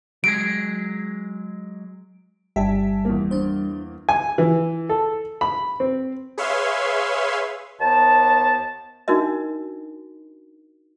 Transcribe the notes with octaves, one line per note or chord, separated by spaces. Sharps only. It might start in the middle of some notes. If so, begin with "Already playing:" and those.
F#3 G#3 G#4 D7
G1 G3 G4 E5 G#5 A5 B6
E2 A#3
D4 C5
G#5
E3
A4
B5
C4
G#4 B4 C#5 E5 F5 C6
D#2 B3 C5 A5
D4 D#4 F#4 A#4 D#5